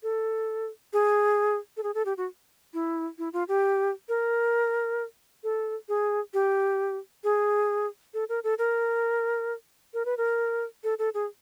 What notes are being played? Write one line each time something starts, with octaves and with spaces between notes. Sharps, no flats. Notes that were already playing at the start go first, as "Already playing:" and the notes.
A4
G#4
A4
G#4
A4
G4
F#4
E4
E4
F4
G4
A#4
A4
G#4
G4
G#4
A4
A#4
A4
A#4
A#4
B4
A#4
A4
A4
G#4